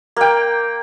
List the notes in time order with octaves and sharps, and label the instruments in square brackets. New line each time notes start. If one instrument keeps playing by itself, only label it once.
[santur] A#3 G5